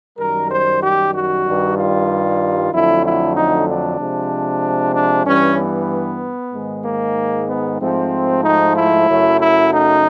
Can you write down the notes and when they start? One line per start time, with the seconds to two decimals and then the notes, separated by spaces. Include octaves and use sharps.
0.18 F#2 D#3 G3 A#4
0.50 C5
0.81 G4
1.13 F#4
1.44 G2 D#3 G3
1.76 F4
2.72 F2 D3 F#3 A3 E4
3.04 E4
3.35 D#4
3.67 D4
3.99 C3 F3 G#3
4.94 D4
5.26 G2 E3 G3 C#4
5.57 B3
6.53 G#2 D#3 G#3
6.85 A#3
7.48 B3
7.80 G#2 F3 A3 C4
8.43 D#4
8.75 E4
9.07 F#2 C#3 F#3 A3
9.38 E4
9.71 D#4